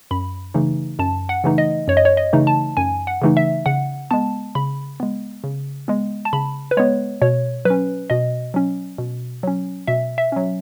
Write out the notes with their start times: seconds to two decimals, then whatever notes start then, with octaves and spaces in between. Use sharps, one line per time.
0.11 F#2 B5
0.54 C#3 E3 A3 D#4
0.99 F#2 A5
1.29 F#5
1.44 C#3 E3 A3 D#4
1.58 D#5
1.88 F#2 C#5
1.97 D#5
2.05 C#5
2.17 D#5
2.33 C#3 E3 A3 D#4
2.47 A5
2.77 F#2 G#5
3.07 F#5
3.22 C#3 E3 A3 D#4
3.37 E5
3.66 C#3 F#5
4.11 G#3 B3 A5
4.55 C#3 B5
5.00 G#3 B3
5.44 C#3
5.88 G#3 B3
6.25 A5
6.33 C#3 B5
6.71 B4
6.77 G#3 B3 C#5
7.22 B2 C#5
7.65 F#3 C#4 B4
8.10 B2 D#5
8.54 F#3 C#4
8.98 B2
9.43 F#3 C#4
9.87 B2 E5
10.18 E5
10.32 F#3 C#4